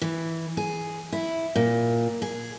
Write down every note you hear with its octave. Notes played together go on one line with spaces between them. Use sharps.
E3
G#4
E4
A#2
G#4